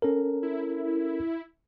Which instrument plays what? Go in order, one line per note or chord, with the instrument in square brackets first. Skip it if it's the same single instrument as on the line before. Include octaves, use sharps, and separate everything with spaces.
[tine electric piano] C#4 A4 A#4
[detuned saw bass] E4